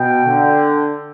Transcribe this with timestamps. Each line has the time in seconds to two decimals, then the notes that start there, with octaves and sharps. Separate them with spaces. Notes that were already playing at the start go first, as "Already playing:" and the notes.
Already playing: B2 G5
0.26 D3